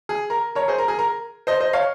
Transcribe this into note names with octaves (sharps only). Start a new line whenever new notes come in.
G#4
A#4
A#4 C#5
G#4 C5
A#4
G#4
A#4
C5 D#5
C5 D#5
C#5 F5